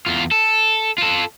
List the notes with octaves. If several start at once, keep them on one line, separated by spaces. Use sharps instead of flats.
E2 F4
A4
F4 A4